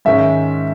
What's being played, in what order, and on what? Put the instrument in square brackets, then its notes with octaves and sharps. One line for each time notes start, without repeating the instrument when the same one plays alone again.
[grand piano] G#2 D#3 G#3 C#4 E5